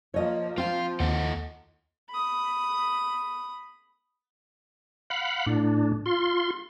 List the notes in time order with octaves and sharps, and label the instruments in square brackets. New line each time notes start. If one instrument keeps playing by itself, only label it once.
[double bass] F3 A#3 [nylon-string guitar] C#5 D#5
[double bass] F3 [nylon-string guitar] C4 [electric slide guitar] F4 F5
[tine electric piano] D#2 [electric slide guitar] A4 D#5 F#5
[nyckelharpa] B5 D#6
[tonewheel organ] F5 F#5 B5
A2 D4
F4 C6